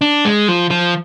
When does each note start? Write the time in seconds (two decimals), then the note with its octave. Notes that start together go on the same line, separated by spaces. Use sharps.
0.01 D4
0.25 G#3
0.48 F3
0.70 F3